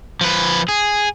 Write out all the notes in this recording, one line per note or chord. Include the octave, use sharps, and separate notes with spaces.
F3 B4
G#4